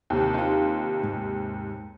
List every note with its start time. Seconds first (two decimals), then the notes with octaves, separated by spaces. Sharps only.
0.10 D#2 C3
0.34 D#4 F4
1.03 G#2